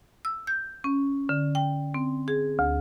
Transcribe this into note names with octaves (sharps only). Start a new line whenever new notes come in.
E6
G6
C#4
D3
G5
C4
G#4
D2